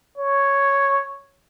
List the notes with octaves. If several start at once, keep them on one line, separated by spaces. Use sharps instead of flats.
C#5